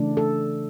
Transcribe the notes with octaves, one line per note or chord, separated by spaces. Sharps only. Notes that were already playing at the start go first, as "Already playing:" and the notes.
Already playing: C#3 E3 A3 D4
A4